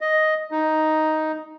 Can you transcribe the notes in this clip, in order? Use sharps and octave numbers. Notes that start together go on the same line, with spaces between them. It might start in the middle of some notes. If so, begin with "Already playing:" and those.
D#5
D#4